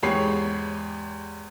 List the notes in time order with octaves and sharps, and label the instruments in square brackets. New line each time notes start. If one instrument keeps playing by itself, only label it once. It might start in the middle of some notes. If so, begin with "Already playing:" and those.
[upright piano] E2 G#2 G4 C#5 B5 C7